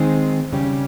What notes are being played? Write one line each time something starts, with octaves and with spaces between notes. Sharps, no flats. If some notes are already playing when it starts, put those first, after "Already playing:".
Already playing: D#3 G#3 C4 D#4 G#4
C#3 G3 C#4 G4